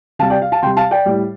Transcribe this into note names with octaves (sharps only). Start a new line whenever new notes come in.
C3 G3 F5 A5
D5 G5
F5
F5 A5
C3 G3 G5 C6
F5 A5
D5 G5
A2 G3